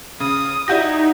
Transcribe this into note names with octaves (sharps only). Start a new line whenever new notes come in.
C#3 D#6
D#4 E4 F#4 G4 D5 G6 A#6